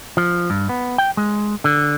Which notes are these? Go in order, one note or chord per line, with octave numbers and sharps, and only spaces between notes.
F3
G2
B3
G5
G#3
D3